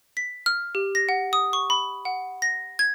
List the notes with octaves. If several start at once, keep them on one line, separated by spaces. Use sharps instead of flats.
B6
F6
G4
A#6
F#5
D#6
C#6
B5
F#5
A#6
G#6